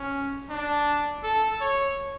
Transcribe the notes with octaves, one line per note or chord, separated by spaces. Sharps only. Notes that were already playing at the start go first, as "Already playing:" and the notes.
Already playing: C#4
D4
A4
C#5